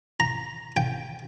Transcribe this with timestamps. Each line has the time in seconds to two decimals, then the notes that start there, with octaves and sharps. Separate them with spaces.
0.20 A#5
0.77 G5